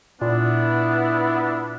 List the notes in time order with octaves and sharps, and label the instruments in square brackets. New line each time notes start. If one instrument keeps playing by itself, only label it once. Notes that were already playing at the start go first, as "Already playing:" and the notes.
[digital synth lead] A#2 [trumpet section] B3 E4 [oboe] D4